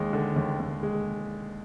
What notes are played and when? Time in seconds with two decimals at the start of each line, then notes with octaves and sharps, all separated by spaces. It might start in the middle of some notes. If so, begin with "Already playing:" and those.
Already playing: D#2 G#3
0.13 D3
0.36 D#2
0.59 D#2
0.83 G#3